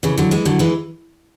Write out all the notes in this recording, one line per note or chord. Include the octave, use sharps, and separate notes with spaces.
C#3 E3
D3 F#3
E3 G#3
D3 F#3
E3 G#3